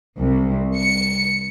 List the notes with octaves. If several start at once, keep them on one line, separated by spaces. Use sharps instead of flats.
C2
C#7